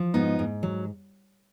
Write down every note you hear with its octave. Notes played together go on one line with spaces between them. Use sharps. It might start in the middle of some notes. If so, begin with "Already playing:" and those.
Already playing: F3
G#2 B3 D#4
G#2
F#3